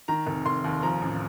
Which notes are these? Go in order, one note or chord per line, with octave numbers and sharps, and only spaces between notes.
D#3 A#5
F1
F1 C6
D#2
F3 A#5
A1